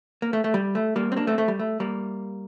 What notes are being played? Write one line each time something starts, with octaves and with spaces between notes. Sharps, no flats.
A#3
A3
A3
G3
A3
G3 A#3
C4
A#3 D4
A3 C4
A3
G3
A3
G3 A#3